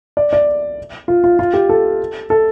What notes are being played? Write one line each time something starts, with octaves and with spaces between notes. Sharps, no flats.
D5
D5
F4
F4
F4
G4
A4
A4